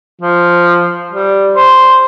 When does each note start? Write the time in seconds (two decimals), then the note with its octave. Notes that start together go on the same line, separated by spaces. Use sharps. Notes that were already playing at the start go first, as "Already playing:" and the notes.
0.22 F3
1.12 G3
1.54 C5